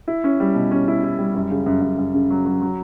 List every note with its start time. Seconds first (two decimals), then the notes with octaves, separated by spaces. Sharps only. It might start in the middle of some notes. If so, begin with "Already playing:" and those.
0.08 E4
0.24 C#4
0.40 G3
0.55 B2
0.71 C#4
0.88 E4
1.04 E4
1.18 G3
1.35 F#2
1.51 C#3
1.66 F#2
1.82 F#2
1.99 F#2
2.14 C#3
2.30 F#3
2.46 F#3
2.62 F#3